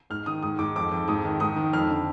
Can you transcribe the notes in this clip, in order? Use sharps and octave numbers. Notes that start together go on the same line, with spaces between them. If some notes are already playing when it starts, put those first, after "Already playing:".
G#2 F6
D#3 D#6
G#2 D#6
G#2 D6
F2 D6
F2
G#2 D#6
D#3
G#2 D#6
D#3
F2 F6
D3